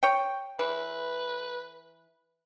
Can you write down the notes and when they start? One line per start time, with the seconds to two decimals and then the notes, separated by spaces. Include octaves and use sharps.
0.03 C#5 G5
0.59 E3 B4